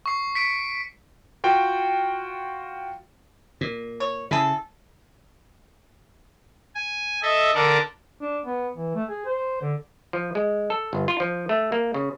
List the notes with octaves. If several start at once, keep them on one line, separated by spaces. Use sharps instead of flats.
C#6 C7
B6 C#7 D7
F4 F#4 G5
A#2
C#5
C#3 E4 G#4 A4
G#5
A4 D#5 E5
D3 A4 A#4 D5
D4
B3
E3
A3
G#4
C5
D3
F3
G#3
A4
G1
F4
F3
A3
A#3
C#3